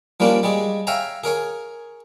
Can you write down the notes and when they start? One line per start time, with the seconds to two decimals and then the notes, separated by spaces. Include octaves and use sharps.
0.20 F3 G3 A#3 C#4 D4
0.43 G3 G#3 G#4
0.87 C#5 E5 F5 G5 G#5 A#5
1.24 G#4 A#4 C#5 G#5